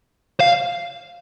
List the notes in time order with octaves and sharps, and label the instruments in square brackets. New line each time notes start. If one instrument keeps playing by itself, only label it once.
[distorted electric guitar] F5